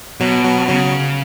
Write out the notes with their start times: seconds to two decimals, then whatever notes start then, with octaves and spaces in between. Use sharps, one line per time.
0.20 B2 F#3
0.44 F#3
0.68 C#3 F#3